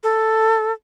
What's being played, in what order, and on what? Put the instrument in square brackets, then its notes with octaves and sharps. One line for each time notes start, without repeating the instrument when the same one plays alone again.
[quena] A4